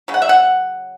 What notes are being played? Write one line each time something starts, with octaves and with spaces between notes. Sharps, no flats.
C#3 F#3
F#5
E5
F#5